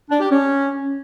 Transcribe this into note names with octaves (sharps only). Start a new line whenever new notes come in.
D4
G4
C#4